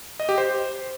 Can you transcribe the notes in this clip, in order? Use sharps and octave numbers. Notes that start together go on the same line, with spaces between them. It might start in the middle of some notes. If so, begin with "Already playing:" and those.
D#5
G4
C5